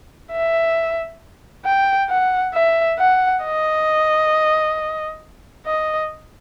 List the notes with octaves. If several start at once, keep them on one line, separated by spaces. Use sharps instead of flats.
E5
G5
F#5
E5
F#5
D#5
D#5